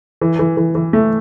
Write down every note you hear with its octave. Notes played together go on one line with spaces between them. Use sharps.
E3
E3
E3
E3
A3